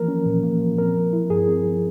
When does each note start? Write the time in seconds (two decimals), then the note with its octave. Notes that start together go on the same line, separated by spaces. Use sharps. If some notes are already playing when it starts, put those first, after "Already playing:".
Already playing: E3 F3 A#3 A#4
0.08 C#4
0.26 A#2
0.43 A#3
0.61 F3
0.78 C4 A#4
0.95 F3
1.13 E4
1.30 G2 G#4
1.48 C4
1.66 F3